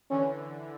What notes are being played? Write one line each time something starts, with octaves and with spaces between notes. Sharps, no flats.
D3 E3 C#4